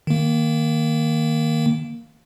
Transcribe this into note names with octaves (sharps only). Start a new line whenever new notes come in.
D#3 A#3